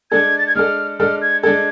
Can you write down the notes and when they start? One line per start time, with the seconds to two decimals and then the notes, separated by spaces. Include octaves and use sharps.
0.11 G#3 D4 A4 G#6
0.38 A6
0.47 G#6
0.55 G#3 D4 A4 F6
0.99 G#3 D4 A4 F6
1.22 G#6
1.43 G#3 D4 A4 G#6